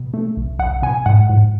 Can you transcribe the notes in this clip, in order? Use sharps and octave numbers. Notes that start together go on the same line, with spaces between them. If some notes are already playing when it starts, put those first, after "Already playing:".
Already playing: B2
A3
B1
B1 F#5
B2 G#5
G#2 F#5
G#2